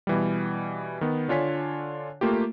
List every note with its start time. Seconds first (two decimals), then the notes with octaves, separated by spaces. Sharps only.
0.07 B2 E3 G3
1.01 D#3 B3
1.29 D3 D4 F4 C#5 G#5 B6
2.21 A3 A#3 F4 G4